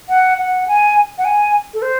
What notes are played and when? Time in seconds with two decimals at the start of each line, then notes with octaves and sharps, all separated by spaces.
0.09 F#5
0.38 F#5
0.68 G#5
1.18 F#5
1.25 G#5
1.74 A4
1.82 C5